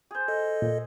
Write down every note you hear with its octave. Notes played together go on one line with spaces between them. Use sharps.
G#4 C5
A4 D#5
A#2